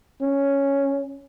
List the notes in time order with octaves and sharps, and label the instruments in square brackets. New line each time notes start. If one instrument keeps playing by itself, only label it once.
[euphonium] C#4